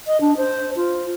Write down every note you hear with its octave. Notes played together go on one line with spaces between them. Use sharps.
D#5
D4
C5
F4